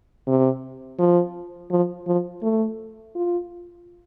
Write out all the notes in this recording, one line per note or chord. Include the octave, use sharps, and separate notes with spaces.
C3
F3
F3
F3
A3
F4